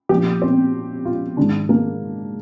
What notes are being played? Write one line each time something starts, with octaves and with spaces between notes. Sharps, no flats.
A#2 F3 G4
C4
F4
G#2 D#3 D4
A#3